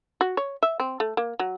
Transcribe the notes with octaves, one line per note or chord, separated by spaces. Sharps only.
F#4
C#5
E5
C4
A3
A#3
F#3